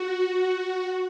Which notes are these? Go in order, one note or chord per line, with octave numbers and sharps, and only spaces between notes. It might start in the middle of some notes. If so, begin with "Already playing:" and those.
Already playing: F#4